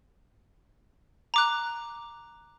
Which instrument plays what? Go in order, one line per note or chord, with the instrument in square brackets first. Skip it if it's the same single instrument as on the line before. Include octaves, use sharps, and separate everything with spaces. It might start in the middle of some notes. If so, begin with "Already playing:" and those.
[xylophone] A#5 D6 F#6